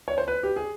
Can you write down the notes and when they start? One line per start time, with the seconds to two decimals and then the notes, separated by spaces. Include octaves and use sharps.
0.08 C#5
0.18 C5
0.28 B4
0.43 G4
0.56 G#4